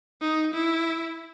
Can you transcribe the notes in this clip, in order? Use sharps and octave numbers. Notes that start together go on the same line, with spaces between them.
D#4
E4